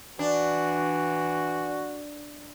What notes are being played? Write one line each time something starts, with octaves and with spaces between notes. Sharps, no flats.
E3 D4 F#4